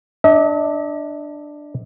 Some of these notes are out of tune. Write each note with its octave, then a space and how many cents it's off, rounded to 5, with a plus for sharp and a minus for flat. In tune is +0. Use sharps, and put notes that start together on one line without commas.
D4 +10 D#5 +45